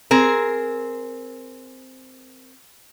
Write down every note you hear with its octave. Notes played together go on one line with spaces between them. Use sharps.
C4 G#4 A#4